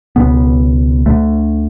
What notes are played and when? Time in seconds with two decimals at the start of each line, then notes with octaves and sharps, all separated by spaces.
0.16 C#2 B2 B3
1.05 D2 D3 A3